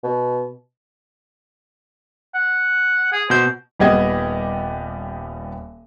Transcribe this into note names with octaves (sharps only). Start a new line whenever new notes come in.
B2
F#5
G#4
B2 C5 G6
D#1 G3 B3 G4 D#5 G#6